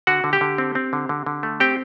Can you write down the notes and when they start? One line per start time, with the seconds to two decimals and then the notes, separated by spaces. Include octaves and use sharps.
0.07 D3 F#4 F#5
0.24 D3
0.33 G4 G5
0.41 D3
0.58 C4
0.75 C4
0.93 D3
1.09 D3
1.26 D3
1.43 A3
1.60 C4 G4 G5